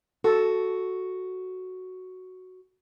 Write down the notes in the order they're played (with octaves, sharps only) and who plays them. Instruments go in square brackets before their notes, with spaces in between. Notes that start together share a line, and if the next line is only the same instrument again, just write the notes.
[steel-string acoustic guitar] F#4 [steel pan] A4